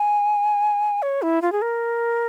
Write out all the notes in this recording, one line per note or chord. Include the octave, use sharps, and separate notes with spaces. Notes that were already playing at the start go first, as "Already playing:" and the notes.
Already playing: G#5
C#5
E4
F4
G#4
A#4